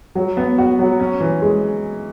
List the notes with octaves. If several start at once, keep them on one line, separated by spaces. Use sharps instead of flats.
F#3
B3
F#4
F#3
C#4
E3
G#3